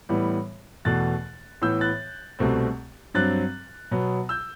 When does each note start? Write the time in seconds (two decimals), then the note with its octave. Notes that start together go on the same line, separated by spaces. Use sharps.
0.09 A2 E3 G3 B3
0.85 E2 B2 A3 F#6 A6
1.62 A2 E3 B3 E6 G6
1.81 F#6 A6
2.39 C2 B2 A3 C4
3.14 G2 F#3 C4 F#6 A6
3.91 B2 F#3 B3
4.29 E6 G6